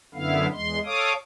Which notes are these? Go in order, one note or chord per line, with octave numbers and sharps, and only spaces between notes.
F#2 D3 B3 E4 F5
E2 G#3 C6
A4 C#5 F5 D6 D#6